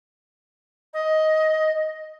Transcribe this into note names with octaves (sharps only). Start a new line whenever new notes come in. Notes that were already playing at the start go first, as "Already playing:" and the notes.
D#5